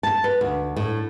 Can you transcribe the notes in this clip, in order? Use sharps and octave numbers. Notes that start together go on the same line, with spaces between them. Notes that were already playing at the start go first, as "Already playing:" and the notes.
A5
B4
D2
A2